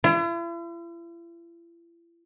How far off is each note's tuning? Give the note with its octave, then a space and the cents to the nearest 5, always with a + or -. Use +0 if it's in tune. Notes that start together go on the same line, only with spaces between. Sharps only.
E4 +45